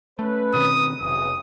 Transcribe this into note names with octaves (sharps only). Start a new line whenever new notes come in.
A3 C#4 B4
B2 D#3 C4 D#6
F1 B1 C#3 E3 D#6